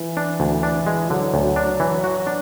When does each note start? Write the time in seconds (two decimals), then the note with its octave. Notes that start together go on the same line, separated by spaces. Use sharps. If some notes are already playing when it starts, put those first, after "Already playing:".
Already playing: E3
0.17 D4
0.40 D2
0.63 D4
0.87 G#3
1.10 D3 F#3
1.34 D2
1.56 D4
1.80 E3
2.04 F#4
2.27 D4